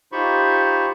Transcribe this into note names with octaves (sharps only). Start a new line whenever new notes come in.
D#4 F4 G4 C5 B5 C#6